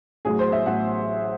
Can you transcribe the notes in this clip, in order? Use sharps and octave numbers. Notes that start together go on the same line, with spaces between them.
A1 A2 F#3 G#4
C5
E5
A1 A2 F#3 F#5